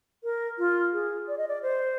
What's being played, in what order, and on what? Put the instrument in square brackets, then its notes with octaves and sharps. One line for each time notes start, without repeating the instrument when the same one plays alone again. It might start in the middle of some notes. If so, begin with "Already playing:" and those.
[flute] A#4
F4
G#4
D5
D#5
D5
C5